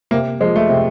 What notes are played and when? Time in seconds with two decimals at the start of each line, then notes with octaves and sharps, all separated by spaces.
0.11 C3 A#3
0.40 F3 G#3
0.56 A3
0.69 C3